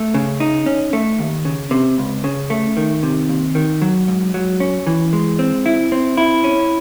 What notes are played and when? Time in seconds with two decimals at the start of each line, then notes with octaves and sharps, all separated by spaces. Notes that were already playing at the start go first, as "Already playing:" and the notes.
Already playing: A3
0.14 C#3
0.40 D#4
0.66 C#4
0.93 A3
1.19 D#2
1.45 C#3
1.71 C3
1.98 C#2
2.24 C#3
2.50 A3
2.77 D#3
3.03 C3
3.29 D#2
3.55 D#3
3.82 F#3
4.08 G#2
4.34 F#3
4.60 C#4
4.87 E3
5.13 G#3
5.39 C4
5.66 E4
5.92 C4
6.17 E4
6.44 C#4